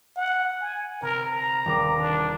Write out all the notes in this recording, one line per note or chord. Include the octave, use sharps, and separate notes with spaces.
F#5
G#5
C3 A#4
A#5
D#1 D6
D4